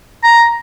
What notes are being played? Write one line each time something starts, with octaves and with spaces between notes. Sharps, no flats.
A#5